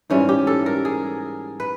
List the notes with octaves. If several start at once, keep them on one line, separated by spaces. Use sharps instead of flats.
G#2 E3 G3 C#4
G4
A4
A#4
G#4
B4